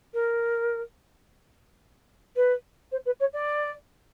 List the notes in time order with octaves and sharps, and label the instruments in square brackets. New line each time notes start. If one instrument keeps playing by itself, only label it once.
[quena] A#4
B4
C5
B4
C#5
D5